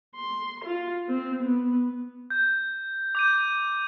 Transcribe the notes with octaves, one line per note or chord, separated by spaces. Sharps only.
C6
F4
C4
B3
G6
D6 G6 D#7